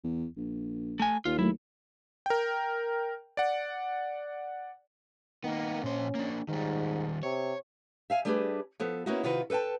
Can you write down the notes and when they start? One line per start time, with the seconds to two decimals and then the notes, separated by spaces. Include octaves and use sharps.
0.04 E2
0.37 A#1
1.00 A3 G#5
1.25 D#2 F4
1.39 F#3 A3 E4
2.26 A#4 G5
3.37 D5 F#5
5.44 D#3 A#3 B3
5.84 A#2 C#4 C5
6.15 A#3 D4
6.49 G#2 D#3 G3
7.23 C3 C#5
8.10 E5 F5 G#5
8.25 G3 A3 D4 G4 G#4 B4
8.80 F3 B3 A4
9.06 A#3 B3 C#4 D#4 E4 F#4
9.23 C3 D#3 F4 F#4 B4
9.50 A4 B4 D5 G5 A5